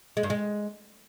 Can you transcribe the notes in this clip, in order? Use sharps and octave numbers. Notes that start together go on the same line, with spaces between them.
G#3
G2
G#3